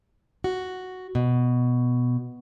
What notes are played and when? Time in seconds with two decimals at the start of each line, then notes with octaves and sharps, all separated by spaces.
0.44 F#4
1.15 B2